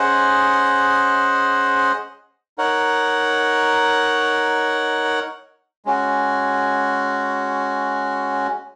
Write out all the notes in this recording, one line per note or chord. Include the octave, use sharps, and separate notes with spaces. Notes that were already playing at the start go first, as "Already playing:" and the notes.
Already playing: C#4 G#4 C5 D#5 F#5
D#4 A#4 C#5 F#5
G#3 C#4 F#4